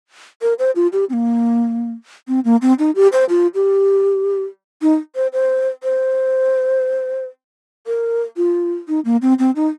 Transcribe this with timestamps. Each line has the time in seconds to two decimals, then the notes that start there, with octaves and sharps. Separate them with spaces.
0.42 A#4
0.59 C5
0.76 F4
0.93 G4
1.09 C4
1.13 A#3
2.28 C4
2.45 A#3
2.62 C4
2.79 D#4
2.96 G4
3.13 C5
3.29 F4
3.55 G4
4.82 D#4
5.16 C5
5.33 C5
5.83 C5
7.87 A#4
8.37 F4
8.88 D#4
9.05 A#3
9.22 C4
9.39 C4
9.56 D#4